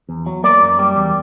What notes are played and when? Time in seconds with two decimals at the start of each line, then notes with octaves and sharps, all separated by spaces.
0.09 E2
0.26 F#3
0.44 A#3 D5
0.61 F#2
0.79 G3
0.97 E2